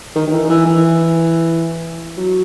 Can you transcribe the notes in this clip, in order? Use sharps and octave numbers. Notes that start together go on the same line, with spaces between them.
D#3
D#3
E3
D#3
E3
E3
F#3